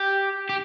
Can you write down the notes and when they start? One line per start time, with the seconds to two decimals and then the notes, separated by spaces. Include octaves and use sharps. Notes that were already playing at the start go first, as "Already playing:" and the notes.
Already playing: G4
0.49 G4